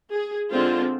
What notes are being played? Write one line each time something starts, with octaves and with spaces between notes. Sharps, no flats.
G#4
D3 G#3 C4 F4 C5